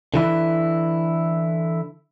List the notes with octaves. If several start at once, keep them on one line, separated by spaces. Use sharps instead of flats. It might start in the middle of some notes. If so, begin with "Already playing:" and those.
D3 E3 E4